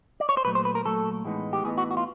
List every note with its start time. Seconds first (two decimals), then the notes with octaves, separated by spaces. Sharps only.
0.20 D5
0.29 C#5
0.37 C5
0.45 A#2 F#3 A3 B4
0.55 C5
0.65 B4
0.75 A#4
0.85 A#2 F#3 A3 A4
1.24 A2 E3 G#3 B3 D#4
1.53 G4
1.64 A2 E3 G#3 B3 D#4 G#4
1.78 F#4
1.91 F#4
1.97 F4